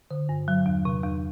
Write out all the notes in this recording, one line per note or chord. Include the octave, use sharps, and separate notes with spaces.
D3
G2
F#3
E2
C3
E2